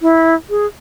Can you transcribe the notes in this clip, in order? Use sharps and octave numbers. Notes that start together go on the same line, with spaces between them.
E4
G#4